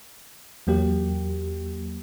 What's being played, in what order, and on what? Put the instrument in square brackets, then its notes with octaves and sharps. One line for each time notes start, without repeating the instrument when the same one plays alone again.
[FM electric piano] E2 F#3 A#3 G4